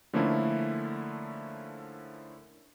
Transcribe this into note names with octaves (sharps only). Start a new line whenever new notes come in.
D3 F3 A3 A#3 C#4 E4